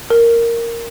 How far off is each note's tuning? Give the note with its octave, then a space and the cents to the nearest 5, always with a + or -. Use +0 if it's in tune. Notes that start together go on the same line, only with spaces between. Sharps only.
A#4 -5